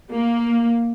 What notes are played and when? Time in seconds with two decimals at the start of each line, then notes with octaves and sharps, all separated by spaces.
0.11 A#3